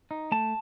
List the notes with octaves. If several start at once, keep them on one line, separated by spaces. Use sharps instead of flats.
D#4
A3 A5